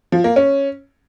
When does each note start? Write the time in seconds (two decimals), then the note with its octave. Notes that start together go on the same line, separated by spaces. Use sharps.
0.12 F3
0.24 A#3
0.36 C#4